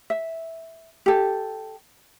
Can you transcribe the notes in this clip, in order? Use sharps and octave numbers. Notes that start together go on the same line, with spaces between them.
E5
G4 A4